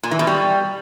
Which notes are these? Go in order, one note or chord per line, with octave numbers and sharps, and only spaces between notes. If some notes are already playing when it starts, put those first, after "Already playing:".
A#2
E3
B2
G3